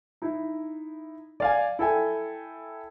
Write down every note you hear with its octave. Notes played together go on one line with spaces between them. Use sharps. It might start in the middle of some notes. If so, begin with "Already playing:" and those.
D#4 E4
D5 F5 G#5
E4 A4 G5 G#5